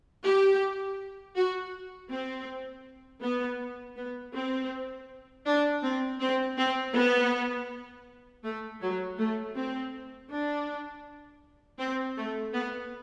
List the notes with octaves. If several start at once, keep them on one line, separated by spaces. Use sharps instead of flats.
G4
F#4
C4
B3
B3
C4
D4
C4
C4
C4
B3
A3
F#3
A3
C4
D4
C4
A3
B3